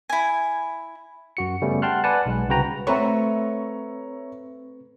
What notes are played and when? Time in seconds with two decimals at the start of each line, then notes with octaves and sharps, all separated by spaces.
0.09 E4 G#5
1.37 F#2 F#4 C#7
1.61 C#3 G3 A3 B3 C#4
1.82 F#5 G5 A5 C6 F6 F#6
2.04 B4 D5 F#5 G#5 A5
2.26 B1 G#3
2.49 C2 C#3 F#4 B4 G5 A#5
2.87 A3 C4 F#4 B4 C#5 E5 A#5 C#6